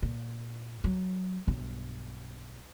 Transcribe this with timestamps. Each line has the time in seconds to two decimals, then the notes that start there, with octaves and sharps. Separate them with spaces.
0.02 A#2
0.84 F#3
1.47 B1 G2